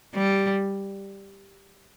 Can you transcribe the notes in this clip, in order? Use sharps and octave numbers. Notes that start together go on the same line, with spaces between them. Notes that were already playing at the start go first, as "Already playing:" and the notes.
G3